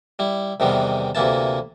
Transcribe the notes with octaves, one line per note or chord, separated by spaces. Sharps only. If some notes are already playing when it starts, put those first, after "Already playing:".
G3 E4
E2 C3 D#3 E3 G3 B3
D2 C3 E3 A#3 E4 A5